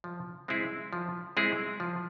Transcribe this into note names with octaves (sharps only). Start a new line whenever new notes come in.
F3
G#3 C4 E4 G#4
F3
G#3 C4 E4 G#4
F3